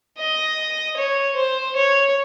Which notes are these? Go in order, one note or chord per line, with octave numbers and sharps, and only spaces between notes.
D#5
C#5
C5
C#5